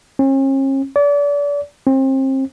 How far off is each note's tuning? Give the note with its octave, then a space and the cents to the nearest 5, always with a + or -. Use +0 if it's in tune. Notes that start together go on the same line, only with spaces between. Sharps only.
C#4 -45
D5 -35
C4 +30